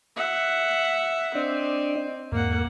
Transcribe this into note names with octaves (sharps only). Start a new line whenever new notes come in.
E5 F#5
C4 D4 D5 D#5
E2 G#2 A#3 F#5